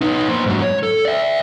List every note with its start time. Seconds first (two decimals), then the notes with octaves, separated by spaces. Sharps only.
0.01 B3 D#4
0.29 A#3 C5
0.46 G#2 F#3
0.62 C#5
0.83 A4
1.05 D5 E5